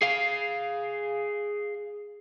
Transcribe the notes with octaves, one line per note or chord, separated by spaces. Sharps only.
G#4 F5